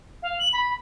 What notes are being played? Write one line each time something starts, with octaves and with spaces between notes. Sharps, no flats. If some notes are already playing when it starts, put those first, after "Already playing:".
F5
F#7
B5